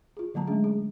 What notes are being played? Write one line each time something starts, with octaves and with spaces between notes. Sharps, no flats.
F4 G#4
D3 F#3 A#3 A5 A#5
G#3 A3 C#4 D4 G#4
G#4